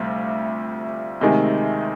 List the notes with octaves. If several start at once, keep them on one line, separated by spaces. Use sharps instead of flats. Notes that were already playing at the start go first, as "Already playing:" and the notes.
Already playing: D2 C3 G3 F4
D2 C3 D#3 G#3 D#4